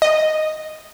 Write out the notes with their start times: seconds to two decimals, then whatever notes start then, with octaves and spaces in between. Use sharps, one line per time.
0.02 D#5